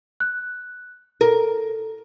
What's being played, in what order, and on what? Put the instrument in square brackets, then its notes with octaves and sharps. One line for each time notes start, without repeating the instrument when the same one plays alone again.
[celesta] F#6
[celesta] A4 [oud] A#4